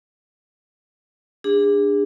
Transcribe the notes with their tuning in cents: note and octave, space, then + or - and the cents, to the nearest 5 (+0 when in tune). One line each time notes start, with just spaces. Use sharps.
D4 +0 G#4 -30